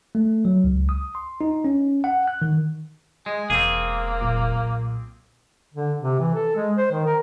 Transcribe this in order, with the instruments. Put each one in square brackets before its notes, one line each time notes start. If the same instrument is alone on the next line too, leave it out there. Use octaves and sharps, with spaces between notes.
[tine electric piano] A3
F#3
C#2
D#6
C6
D#4
C#4
F#5
F#6
D#3
[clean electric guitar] G#3 [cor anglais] G#5
[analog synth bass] E1 [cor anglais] A#3 [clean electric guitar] C4 G#4
[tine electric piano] B1 A#2 D6
[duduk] D3
C3
E3
A4
G#3
C5
D#3
A#4